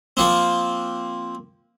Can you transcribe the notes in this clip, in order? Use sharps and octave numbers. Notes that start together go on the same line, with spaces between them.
F3 A#3 C4